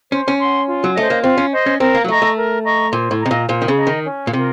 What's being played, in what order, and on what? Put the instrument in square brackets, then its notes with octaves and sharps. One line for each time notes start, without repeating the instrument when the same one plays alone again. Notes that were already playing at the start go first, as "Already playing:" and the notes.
[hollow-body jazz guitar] C#4 [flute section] C5
[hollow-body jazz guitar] C#4
[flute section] F#5 C6
F4
[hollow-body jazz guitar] F#3
[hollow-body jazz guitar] A3 [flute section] C5 D#5
[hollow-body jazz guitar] A#3
[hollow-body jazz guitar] C4 [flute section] F4
[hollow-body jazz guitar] C#4
[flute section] C5 D#5
[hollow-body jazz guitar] C#4
[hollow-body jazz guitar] C4 [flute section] A#4
[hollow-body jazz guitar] A#3
F#3
[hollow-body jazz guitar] A3 [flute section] D#5 A#5 C#6
[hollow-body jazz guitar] A3
[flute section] A#4
D#5 A#5 C#6
[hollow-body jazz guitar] A#2 [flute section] C5
[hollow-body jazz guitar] A2
[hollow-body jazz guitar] C3 [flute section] D#5 A#5
[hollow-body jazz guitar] A#2
[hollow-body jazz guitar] A#2 [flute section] C5
[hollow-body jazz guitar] D#3
C#3
[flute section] D#5 A#5
[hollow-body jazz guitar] D#3
[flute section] C#4
[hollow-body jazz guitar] A#2
[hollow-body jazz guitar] C3 [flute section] F4 A#4